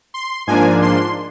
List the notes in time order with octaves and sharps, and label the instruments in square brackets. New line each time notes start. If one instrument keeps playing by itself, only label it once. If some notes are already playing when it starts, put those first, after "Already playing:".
[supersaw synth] C6
G#2 F3 A#3 D4 G#5
C6